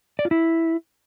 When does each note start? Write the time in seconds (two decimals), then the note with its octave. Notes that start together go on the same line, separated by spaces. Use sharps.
0.19 D5
0.25 F4
0.31 E4